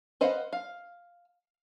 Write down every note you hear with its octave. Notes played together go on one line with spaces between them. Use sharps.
B4 C5 D#5 F5 F#5
F5